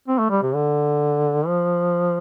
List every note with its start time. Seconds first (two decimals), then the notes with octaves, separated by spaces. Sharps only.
0.08 C4
0.19 A3
0.30 G3
0.42 C3
0.54 D3
1.46 F3